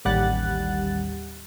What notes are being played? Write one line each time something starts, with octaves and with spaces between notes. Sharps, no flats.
A1 D#2 G3 F#5 F#6 A6